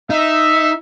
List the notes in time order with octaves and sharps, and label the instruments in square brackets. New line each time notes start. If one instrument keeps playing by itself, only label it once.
[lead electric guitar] D#4 [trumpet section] E5